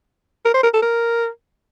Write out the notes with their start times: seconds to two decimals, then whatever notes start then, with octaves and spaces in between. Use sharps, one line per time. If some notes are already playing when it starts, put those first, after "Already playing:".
0.45 A#4
0.54 C5
0.63 A#4
0.74 A4
0.82 A#4